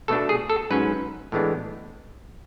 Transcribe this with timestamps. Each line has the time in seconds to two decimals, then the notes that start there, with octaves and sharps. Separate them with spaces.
0.08 B2 A3 D4 A4
0.29 G#4
0.50 A4
0.70 G#2 F#3 C#4 B4
1.32 A2 E3 G#3 B3 D4